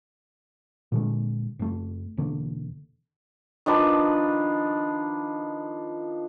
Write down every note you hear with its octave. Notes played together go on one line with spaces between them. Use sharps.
A#2 D3 G#3
F#1 A3
E1 E2 D3 A#3
D#3 F3 D4 B4